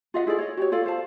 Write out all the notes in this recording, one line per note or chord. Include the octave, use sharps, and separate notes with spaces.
F4 D#5 F5 F#5
E4 G#4 A4 D5
C#5 D#5
F#4 G4 C#5
F4 A4 D5 F5
C5 F5 A5